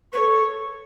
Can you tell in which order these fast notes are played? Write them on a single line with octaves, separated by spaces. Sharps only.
B4 C#5 A4